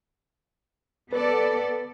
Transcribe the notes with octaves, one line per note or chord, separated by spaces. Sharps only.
B3 A4 B4 D5